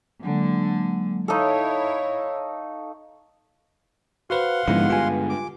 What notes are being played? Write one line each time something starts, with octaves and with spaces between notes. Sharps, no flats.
D3 F#3 G#3 A#3
D#4 E4 A4 C#5 D#5 F5 C#6
F#4 B4 C5 F5 F#5 C6
G#2 D3 F3 G#3 B3 E4
G2 F4 G#5
D6